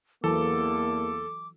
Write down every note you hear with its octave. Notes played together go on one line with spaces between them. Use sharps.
E2 E3 F#3 A#3 A4 D6